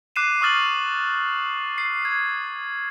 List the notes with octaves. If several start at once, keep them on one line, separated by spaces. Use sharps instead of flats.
D6 F#6 C7 D#7 E7
C#6 D#6 F6 A6 F#7
C7
G#6